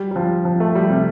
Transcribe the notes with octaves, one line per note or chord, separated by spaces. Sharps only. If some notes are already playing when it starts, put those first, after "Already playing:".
Already playing: G3
G3
F3
F3
A3
G3
C3